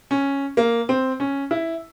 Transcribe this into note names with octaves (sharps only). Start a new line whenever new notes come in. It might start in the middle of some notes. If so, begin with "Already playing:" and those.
C#4
A#3
C4
C#4
E4